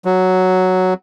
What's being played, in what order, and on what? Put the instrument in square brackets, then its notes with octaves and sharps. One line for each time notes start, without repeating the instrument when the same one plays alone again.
[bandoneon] F#3